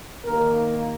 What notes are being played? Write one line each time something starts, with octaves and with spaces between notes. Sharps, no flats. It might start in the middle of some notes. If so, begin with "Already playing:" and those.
D#2 D#3 A#3 A#4